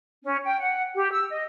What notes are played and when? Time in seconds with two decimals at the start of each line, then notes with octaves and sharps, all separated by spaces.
0.24 C#4
0.44 G5
0.59 F#5
0.96 G4
1.12 E6
1.29 D#5